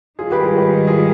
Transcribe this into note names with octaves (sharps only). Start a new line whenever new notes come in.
G#2 D#3 G3 F4 G#4
G4 B4
F4 G#4
G4 B4
F4 G#4